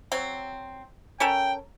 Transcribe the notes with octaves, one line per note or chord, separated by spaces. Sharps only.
F#3 C4
C#4 A4 A#4 G5